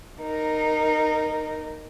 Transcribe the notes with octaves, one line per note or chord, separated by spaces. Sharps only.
D#4 A#4